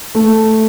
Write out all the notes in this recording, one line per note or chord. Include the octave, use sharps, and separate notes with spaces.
A3